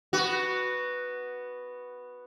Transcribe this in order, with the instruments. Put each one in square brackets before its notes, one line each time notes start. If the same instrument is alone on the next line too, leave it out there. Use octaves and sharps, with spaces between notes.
[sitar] B3 F#4